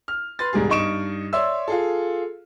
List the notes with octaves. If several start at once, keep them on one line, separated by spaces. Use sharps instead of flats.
F6
B4 C6 A6
E1 G#2 G3 G#4
G2 D#4 D#5 C#6 D7 E7
C#5 D5 E5 C6 E6
F4 G#4 A4